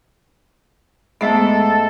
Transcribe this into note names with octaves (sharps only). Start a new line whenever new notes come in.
G#2 G#3 A3 B3 A4 D#5 E5 E6